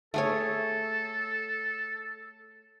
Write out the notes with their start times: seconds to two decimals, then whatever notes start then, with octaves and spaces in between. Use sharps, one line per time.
0.14 A3 G#4 A4 C#5